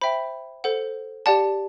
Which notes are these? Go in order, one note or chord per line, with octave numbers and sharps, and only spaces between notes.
C5 E5 G5 B5
A4 C5 F#5
G4 D5 F#5 A5